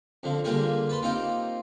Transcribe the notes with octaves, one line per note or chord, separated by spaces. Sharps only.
F2 D3 F3
D3 G3 A#3 F4 G4 G#4
B4 A5 B5 C6
A#3 C4 D#4 F4 G4